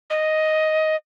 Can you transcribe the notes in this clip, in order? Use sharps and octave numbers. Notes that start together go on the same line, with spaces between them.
D#5